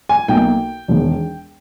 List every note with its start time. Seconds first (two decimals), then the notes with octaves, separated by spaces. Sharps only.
0.09 G#5
0.28 B1 B2 A#3 G5
0.88 E1 E2 D#3